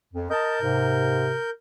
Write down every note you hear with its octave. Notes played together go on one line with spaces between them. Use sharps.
F2
A#4 D#5 A5 G6
G#2 C3